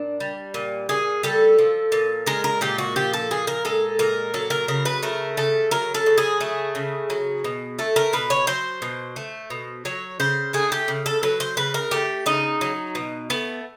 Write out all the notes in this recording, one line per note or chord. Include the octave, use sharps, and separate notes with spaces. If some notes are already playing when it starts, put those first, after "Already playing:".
Already playing: A#2 D4
G3
A#2
A#2 G#4
G3 A4
F3
A#2
G#3 A#4
A#4
A#2 G4
F#4
F3 G4
A4
A#2 G#4
A#4
G#3 A4
A#2 A#4
F#3 A4
A#4
C#3 A#4
B4
A3 A#4
C#3 A4
F#3 A#4
A4
C#3
G#4
A3
C#3
F#3
B2
A3 A4
A#4
B2 B4
C#5
F#3 C5
B2
A3
B2
F#3 C#5
C#3 C5
A3 G#4
G4
C#3
A4
F#3 B4
C5
C#3 B4
A#4
A3 G4
C#3 D#4
F#3
B2
A3 B3